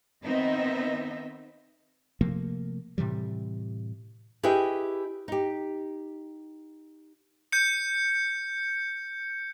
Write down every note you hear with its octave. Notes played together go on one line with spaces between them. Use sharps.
D#3 B3 C4 D#4 D#5 E5
C3 F3 A3 A#3
A2 C3 E3 G3
E4 G4 G#4 B4 D#5 G5
D#4 G4
G6 C#7